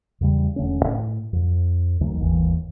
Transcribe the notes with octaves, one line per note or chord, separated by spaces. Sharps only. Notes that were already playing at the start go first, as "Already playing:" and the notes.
E2 C#3 G3
E1 D3 A3 C#4
A2
F2
D2 D#3 F#3
G1 D#2 D3 E3